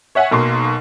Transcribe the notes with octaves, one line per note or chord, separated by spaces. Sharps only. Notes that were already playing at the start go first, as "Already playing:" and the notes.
C#5 E5 F#5 G#5
B1 B2 A#3 C6